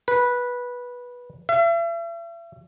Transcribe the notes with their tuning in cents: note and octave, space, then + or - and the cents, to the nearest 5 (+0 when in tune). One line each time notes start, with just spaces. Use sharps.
B4 -15
E5 +40